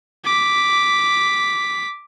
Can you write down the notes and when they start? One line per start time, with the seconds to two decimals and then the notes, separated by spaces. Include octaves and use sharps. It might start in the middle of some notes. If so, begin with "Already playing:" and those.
0.25 D6 B6